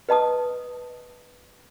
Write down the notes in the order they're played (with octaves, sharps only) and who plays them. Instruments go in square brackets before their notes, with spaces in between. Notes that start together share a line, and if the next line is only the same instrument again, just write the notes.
[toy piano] B4 D#5 A5 D#6